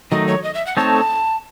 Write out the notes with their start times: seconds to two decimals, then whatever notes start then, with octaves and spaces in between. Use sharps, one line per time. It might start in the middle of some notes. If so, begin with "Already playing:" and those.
0.11 D#3 F#3 A3 D#4 D#5
0.28 C#5
0.44 D#5
0.55 E5
0.66 F#5
0.77 A3 C4 D#4 A4 C#5 A5